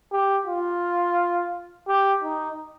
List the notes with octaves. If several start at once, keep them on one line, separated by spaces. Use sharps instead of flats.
G4
F4
G4
D#4